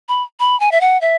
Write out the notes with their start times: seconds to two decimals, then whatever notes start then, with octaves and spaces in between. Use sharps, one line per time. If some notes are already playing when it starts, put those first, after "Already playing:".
0.09 B5
0.40 B5
0.60 G#5
0.72 E5
0.81 F#5
1.01 E5